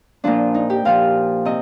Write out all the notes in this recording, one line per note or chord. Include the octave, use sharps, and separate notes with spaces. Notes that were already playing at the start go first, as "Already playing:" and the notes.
A#2 F3 D4
D#4
G4
A#2 F3 F5
C3 D#5